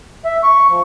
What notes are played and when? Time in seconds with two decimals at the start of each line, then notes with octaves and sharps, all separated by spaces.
0.25 E5
0.43 C#6
0.70 F3